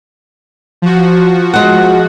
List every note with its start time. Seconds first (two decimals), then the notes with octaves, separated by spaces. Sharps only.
0.82 F3 F#4
1.54 G#3 F#5